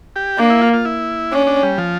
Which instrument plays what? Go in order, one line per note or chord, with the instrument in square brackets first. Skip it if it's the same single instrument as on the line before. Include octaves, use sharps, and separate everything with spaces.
[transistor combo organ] G4
[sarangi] A#3 [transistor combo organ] D4
[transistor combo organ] E4
F4
F4
E4
[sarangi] C#4 [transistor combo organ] D4
[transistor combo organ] D4
G3
F3